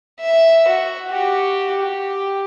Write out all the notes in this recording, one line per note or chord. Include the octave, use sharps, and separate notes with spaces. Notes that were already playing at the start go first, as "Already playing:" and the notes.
E5
F#4
F#4 G4
G4